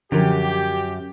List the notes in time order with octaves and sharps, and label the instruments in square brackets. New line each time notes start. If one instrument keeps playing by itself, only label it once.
[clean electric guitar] F#2 [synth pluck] D3 F3 A#4 [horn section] G4